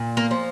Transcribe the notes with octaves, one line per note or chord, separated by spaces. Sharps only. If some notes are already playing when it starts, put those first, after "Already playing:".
Already playing: A#2
A#3
F3